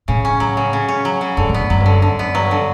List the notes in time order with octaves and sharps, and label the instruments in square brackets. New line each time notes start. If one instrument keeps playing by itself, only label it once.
[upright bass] A2 [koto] C#3
[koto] C#4
F#3
C#3
C#3
C#4
F#3
C#3
[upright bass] F#2 [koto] D3
[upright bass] A2
[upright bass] F#2 [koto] B3
[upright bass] F#2 [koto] F#3
[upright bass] G2
[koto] D3
[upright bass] F#2
[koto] D3
B3
[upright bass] G2 [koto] F#3
[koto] D3